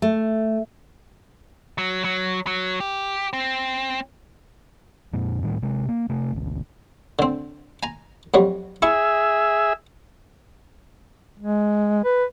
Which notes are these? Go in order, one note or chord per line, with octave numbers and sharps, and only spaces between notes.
A3
F#3
F#3
F#3
G4
C4
F2 A#2
A2 D#3 G3
C3 G#3
A#3
C3 A3
G#1 D2
D3 C4
G#5 A#5
F2 F#3 G3
E4 G#4 E5 C#6
G#3
B4